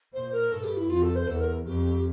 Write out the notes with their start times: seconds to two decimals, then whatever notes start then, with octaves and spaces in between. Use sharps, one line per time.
0.14 A#2 C5
0.32 A#4
0.52 G2 A4
0.64 G4
0.77 E4
0.90 F2 F4
1.03 A4
1.15 C5
1.28 E2 A4
1.41 A#4
1.66 F2 G4